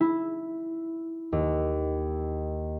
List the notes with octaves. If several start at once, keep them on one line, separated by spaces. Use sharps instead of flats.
E4
D#2